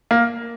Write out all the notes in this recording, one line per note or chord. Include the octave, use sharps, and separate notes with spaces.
A#3